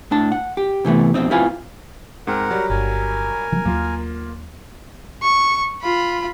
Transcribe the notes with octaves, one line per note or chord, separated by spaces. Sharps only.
A2 D4 A5
F#5
G4
C3 E3 A3 B3
F2 B2 C4 D#4
C4 E4 F4 B4 F5 G#5
G#2 C4 A#4 F#5 G5
F#3 G3
G1 A#4 G#5
E3 F#3
D#2 F#3 A#3 F4
C#6
F4 B5